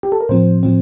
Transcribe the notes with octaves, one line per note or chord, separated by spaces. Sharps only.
G4
A4
A#4
A2 F3 C4 C5
A2 F3 C4